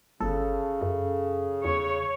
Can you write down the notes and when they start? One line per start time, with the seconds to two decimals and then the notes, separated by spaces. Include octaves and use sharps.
0.20 G1 C#3 A4
0.82 F#2
1.65 E2 C#5